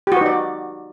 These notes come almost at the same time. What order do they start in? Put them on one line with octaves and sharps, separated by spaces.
G4 F#4 B4 D#4 D5